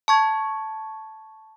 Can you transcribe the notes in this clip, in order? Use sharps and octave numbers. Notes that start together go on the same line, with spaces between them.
A5 C#6 G#6